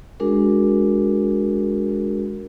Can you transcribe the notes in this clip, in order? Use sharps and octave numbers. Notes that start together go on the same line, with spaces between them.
G#3 D4 F#4 G#4 A#4